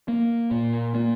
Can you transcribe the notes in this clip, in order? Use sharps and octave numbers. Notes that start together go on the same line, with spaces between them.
A#3
A#2
A#3